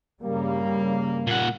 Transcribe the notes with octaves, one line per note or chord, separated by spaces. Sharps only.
G2 C#3 G3 A#3
A#2 F#5